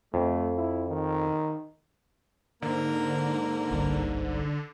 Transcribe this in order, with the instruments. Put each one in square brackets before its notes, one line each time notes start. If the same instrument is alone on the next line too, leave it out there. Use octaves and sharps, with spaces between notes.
[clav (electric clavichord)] F2 [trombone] A3
[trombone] E4
D#3
[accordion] G#2 [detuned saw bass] D3 [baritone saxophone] A#3
[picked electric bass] G1 C2 G2